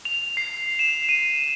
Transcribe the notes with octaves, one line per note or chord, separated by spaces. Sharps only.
F7
C7
E7
D#7